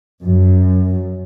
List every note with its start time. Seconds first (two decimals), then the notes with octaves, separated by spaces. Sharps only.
0.23 F#2